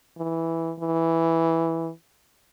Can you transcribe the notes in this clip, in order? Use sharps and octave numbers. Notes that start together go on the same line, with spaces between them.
E3
E3